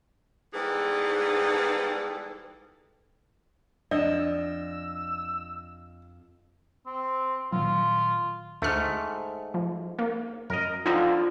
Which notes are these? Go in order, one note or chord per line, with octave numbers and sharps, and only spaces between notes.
G#2 E3 G3 B3 G#4 A4
F2 D4 D5 D#5 E6
C4
A#2 D#3 F#3 F4
D2 G#2 A3 F6
F3
A#3
F#2 A#4 D#5
F2 D3 F3 D#4 F4 D#5